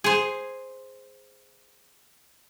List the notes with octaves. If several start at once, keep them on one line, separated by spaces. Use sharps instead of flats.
G#4 C5